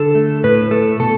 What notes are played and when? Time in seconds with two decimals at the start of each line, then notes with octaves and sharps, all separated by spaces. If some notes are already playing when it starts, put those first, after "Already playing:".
Already playing: D3 A4
0.15 A3
0.44 A2 B4
0.71 A3 A4
1.00 B2 A4